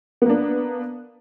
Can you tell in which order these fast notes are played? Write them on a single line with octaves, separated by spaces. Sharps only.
B3 A#3 D4